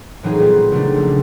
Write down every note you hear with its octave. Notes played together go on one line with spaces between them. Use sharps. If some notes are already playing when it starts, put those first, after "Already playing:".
A2 E3 F#3 C4 D#4 G#4
A#2 G3 B3 C4
C#3 F#3 A3 C4 D4
A#1